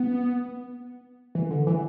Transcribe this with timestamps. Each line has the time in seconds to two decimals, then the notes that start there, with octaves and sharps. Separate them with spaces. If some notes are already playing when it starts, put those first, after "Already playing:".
Already playing: B3
1.35 E3
1.51 D3
1.67 E3